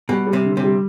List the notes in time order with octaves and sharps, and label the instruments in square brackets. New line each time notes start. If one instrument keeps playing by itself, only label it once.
[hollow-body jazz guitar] B2 [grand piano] G3
[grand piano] G3
[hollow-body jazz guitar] C3
[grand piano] D3
[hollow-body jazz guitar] C3
[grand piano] G3